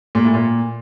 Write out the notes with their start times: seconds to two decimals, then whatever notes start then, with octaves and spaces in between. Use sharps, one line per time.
0.15 A#2
0.24 A2
0.34 A#2